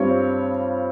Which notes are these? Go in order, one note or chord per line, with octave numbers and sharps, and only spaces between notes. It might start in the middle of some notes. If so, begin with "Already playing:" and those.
Already playing: G2 G3 C4 F4 C#5